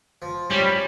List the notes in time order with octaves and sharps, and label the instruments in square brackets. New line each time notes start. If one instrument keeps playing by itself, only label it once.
[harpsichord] F3
[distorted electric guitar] G3 [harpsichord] C#4